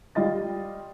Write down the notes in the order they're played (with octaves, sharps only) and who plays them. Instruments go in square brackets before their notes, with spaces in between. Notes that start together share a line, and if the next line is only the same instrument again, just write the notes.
[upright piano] G3 F4 D#5 A6